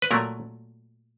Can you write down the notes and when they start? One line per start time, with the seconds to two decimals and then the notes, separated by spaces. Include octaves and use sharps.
0.02 B4
0.11 A#2 F#3 A3 A#4